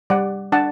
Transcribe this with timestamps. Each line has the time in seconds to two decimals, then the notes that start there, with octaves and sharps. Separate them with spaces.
0.10 G3 D5 F#5
0.52 D4 F#5 A5